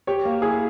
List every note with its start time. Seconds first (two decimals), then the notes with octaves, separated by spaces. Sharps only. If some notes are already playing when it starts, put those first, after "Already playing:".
0.07 G4 C#5
0.25 A#3
0.42 E4 G#4